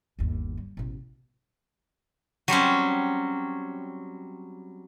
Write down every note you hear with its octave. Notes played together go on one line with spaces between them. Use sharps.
G1 D#2
G3
A1 B2
F#3 G3 C4 C#4